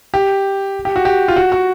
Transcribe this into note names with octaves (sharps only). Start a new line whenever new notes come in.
G4
G4
F#4
G4
F4
F#4
F#4